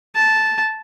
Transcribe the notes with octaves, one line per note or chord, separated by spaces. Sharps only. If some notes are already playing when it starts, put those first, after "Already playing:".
A5